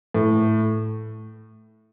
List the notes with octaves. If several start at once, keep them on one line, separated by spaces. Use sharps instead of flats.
A2